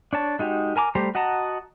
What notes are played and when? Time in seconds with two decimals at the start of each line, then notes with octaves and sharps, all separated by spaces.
0.13 D4 C#5 A5
0.39 G#3 D#4 F#4 G4
0.76 A#4 G#5 A#5 D6
0.95 G3 A3 G4 C5 A#5
1.15 F#4 D#5 F#5 A5 A#5